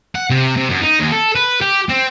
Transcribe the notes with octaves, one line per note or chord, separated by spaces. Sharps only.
F#5
C3
C3
F#2
D#4
D#2
A4
B4
G4
C4